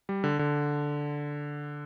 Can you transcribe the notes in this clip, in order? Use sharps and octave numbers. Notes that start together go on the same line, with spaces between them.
G3
D3
D3